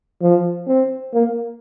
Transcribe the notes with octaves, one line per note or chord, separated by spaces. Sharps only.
F3
C4
A#3